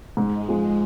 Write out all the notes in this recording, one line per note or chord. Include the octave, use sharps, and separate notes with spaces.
G#2 G#3
F3 G#3